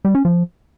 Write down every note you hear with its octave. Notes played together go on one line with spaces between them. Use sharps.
G3
C#4
F3